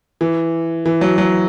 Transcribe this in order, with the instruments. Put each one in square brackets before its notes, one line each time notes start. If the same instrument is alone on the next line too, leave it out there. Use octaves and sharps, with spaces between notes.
[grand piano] E3
E3
F#3
F#3